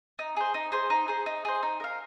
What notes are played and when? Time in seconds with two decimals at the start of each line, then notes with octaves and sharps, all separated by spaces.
0.19 D#4
0.37 G#4 C5
0.54 D#4
0.72 G#4 C5
0.90 D#4
1.08 G#4 C5
1.26 D#4
1.45 G#4 C5
1.63 D#4
1.80 A#4 F5